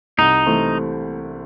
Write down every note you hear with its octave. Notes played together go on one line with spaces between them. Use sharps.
C2 D#4
C3 E3 A3 C4